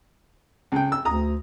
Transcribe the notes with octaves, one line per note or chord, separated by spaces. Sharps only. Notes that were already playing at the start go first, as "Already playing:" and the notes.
C#2 G5
E6
D2 A#5 D#6